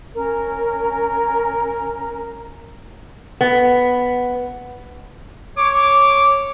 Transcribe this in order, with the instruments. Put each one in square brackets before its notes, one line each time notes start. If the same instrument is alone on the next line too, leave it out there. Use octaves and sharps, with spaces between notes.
[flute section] C#4 A#4 A#5
[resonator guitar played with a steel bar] B3
[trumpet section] C#5 D6